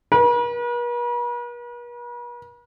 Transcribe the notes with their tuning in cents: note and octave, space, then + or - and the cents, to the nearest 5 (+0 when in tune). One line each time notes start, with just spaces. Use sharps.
B4 -45